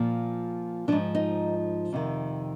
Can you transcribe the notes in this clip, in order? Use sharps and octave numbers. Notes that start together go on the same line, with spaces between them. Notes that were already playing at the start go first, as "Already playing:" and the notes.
Already playing: A#2 F3
G#2 F3 D4
D#4
F2 C3 D#3